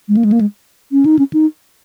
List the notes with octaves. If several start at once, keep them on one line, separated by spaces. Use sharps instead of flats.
G#3
A#3
G#3
A#3
G#3
C#4
D#4
C#4
D#4